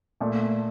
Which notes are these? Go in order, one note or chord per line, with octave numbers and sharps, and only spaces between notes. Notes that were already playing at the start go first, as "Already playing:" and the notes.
A#2 A3